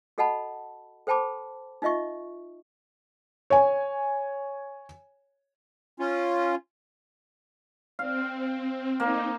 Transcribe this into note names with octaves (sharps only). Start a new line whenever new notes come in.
F#4 A4 D#5 F#5 A5 B5
A4 C5 G5 A5 B5 D6
D#4 F4 D#5 E5 C#6
C#5 G#5
C#4 F4
C4 F5
A#3 C4 D#4